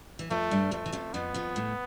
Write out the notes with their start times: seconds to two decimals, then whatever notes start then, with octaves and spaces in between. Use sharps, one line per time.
0.19 E3
0.30 F2 F3 A3
0.51 G2 G3
0.71 F2 F3 A3
0.86 E3
0.92 F2 F3
1.13 F2 F3 B3
1.34 F2 F3
1.56 A2